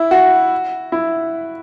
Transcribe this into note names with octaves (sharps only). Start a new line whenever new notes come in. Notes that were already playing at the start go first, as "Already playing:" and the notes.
Already playing: E4
F#4
E4